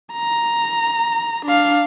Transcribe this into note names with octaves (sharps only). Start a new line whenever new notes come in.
A#5
D4 F5